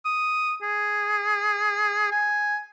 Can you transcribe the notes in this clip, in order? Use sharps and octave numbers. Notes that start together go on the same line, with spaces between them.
D#6
G#4
G#5